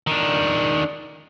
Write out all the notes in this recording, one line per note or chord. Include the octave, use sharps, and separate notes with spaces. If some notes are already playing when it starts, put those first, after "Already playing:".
D#3 D4